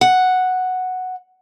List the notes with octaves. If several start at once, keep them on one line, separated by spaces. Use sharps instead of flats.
F#5